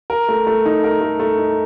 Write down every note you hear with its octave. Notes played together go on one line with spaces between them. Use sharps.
A#4
A3
A3
D#4
A#4
A3
A3
D#4